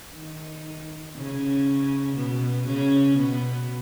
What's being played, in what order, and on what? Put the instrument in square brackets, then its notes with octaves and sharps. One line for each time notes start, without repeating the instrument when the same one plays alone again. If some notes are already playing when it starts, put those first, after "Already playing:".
[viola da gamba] D#3 D#4
C#3 C#4
B2 B3
C#3 C#4
B2 B3